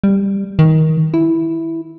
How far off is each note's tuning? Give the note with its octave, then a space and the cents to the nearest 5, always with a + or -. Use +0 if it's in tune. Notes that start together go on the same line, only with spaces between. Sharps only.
G3 +10
D#3 +20
E4 -5